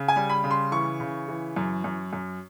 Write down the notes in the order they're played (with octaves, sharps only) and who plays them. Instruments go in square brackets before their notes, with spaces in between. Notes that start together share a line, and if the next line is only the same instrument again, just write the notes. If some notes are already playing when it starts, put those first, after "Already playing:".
Already playing: [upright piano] C#3
G#5
G3
B5
C#3
C6
E3 C#6
C#3
E3
F#2
F#2
F#2